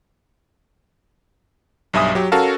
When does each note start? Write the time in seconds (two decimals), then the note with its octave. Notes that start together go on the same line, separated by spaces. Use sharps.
1.93 B1 G2 E5 G#5 D#6
2.15 F#3 G4
2.32 C#4 F#4 A4 A#4 F5 A5